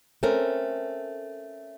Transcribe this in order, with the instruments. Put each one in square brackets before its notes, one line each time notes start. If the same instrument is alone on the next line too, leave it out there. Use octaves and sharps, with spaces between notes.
[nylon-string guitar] A3 C4 C#4 A#4